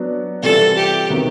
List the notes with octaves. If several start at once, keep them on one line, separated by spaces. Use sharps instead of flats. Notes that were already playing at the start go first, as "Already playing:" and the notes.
Already playing: F#3 B3 D4
C3 E3 G3 C4 F4 A4
G4
C3 D#3 F#3 B3